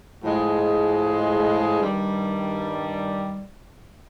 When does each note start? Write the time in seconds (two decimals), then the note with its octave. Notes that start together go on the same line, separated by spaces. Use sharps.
0.22 A2 F3 G#3
1.81 G2 D#3 G3